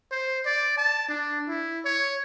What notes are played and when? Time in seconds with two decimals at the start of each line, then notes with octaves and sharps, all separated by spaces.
0.12 C5
0.46 D5
0.77 A5
1.09 D4
1.48 E4
1.85 C#5